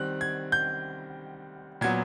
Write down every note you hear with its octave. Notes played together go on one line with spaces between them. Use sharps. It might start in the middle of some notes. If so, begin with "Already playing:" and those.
Already playing: D#3 G3 C4 F#6
G#6
G6
A#2 F#3 B3 G#6